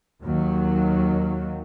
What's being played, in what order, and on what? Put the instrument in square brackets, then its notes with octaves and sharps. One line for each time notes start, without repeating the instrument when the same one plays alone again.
[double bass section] D#2 D#3 F#3